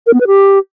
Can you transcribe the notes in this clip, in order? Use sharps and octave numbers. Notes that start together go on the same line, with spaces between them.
A#4
B3
B4
G4